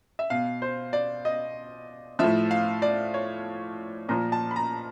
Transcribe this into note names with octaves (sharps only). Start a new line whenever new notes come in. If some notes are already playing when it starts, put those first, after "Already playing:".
E5
B2 F5
C5
D5
D#5
A2 F3 E5
F5
D5
C#5
A#2 F3 A#5
A5
B5
A#5